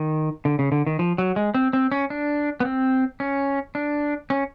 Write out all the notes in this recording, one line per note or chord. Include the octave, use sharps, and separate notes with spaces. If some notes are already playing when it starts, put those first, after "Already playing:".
Already playing: D#3
D3
C#3
D3
D#3
F3
F#3
G#3
C4
C4
C#4
D4
B3
C4
C#4
D4
C#4